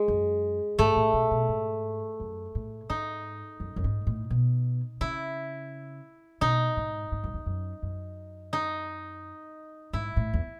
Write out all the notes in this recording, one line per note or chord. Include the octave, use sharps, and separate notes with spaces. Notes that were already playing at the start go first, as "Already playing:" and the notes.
Already playing: G#3
F#2
G#2 A3
A2
B2
B2
G#2
F#2
A2
G#2 D#4
F#2
F#2
G#2
A2
B2
C#3 E4
B2 D#4
G#2
G#2
F#2
E2
F#2
F#2
D#4
G#2 E4
A2
E2